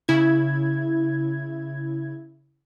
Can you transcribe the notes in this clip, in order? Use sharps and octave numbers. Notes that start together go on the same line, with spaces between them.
C#3 E4 G#6